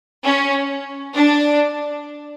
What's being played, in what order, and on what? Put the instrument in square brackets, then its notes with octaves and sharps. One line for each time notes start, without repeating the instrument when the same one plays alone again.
[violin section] C#4
D4